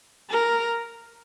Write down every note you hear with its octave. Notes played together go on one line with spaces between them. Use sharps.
A#4